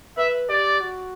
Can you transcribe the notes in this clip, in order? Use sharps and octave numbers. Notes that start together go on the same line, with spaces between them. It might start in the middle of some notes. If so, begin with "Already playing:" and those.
B4 E5
G4 D5
F#4